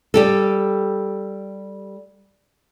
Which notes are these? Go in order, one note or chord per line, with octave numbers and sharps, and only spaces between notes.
G3 G4 A4